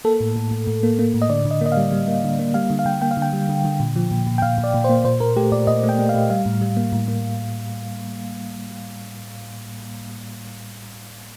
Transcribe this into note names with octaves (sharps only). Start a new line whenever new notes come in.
A#3 A4
A2
A2
A2
A2
A#3
A#3
A2
D#5
D3 D5
D3
D#5
A#3 D#5
G3 F5
G3
A#3
D3
A#3
G3 F5
D3
F5
D3 G5
A#3 G5
F5
D3
G5
G3
D3
D3
A#2
F3
A#2
A#2
G5
A#2 F5
A#2
D5
A#2
A#3 C5
A#2 C5
A#2 A#4
A3 G4
A#2 D5
A#2 D#5
A3
G5
A3
F5
A#2
G3 F5
A2
G3
A#3
A2
A#3